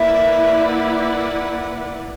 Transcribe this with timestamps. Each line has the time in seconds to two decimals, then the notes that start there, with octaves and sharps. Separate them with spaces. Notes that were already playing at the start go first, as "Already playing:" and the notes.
Already playing: A#3 E4 B4 D5 E5
0.67 F#5